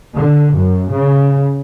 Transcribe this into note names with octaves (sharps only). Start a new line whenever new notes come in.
D3
F#2
C#3